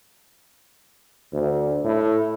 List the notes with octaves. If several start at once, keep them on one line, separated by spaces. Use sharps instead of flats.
D2
A2